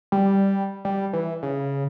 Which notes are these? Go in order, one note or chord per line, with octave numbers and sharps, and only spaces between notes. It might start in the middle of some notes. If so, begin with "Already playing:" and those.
G3
G3
E3
C#3